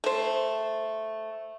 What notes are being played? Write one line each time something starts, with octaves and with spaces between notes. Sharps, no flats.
A3 C5